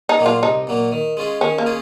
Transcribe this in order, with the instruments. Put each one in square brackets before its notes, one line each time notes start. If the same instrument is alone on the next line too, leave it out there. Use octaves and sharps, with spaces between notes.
[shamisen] D#4
[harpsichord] A#2 F#3 A#3
[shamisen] F4
[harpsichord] C2 [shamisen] D#4
[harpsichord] A#2 F#3 A#3
D#3
G#3 C#4 F4 G#4
[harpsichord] D#3 [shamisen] C#4
[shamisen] A#3
[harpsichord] C#4 F4 G#4